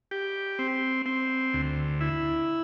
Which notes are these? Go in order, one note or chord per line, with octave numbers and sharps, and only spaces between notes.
G4
C4
C4
D2
E4